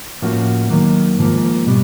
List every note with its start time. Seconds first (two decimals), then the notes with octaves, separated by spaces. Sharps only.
0.22 A2 F3 A#3 C#4 F#4
0.70 D#2 D#3 F#3 A#3
1.19 G#2 F3 A#3
1.67 B2 G3